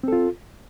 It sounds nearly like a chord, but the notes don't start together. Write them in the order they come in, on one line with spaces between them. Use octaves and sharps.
C4 A4 F4